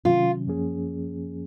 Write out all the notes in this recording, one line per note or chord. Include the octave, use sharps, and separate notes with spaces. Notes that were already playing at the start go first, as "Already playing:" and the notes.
C3 D#3 F#3 C#4 F4
F#2 F3 A#3 C#4 G#4